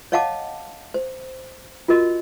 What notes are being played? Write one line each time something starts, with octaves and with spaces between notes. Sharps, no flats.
C#5 D#5 F5 F#5 A5 D6
C5
F4 F#4 A#4 D#5